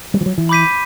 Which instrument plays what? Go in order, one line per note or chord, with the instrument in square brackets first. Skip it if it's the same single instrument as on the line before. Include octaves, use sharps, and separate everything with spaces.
[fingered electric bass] G3
F3
F#3
E3
[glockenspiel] B5 D6 G6 B6 D#7